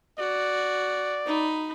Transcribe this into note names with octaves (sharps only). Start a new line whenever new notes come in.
F#4 D5
D#4 B5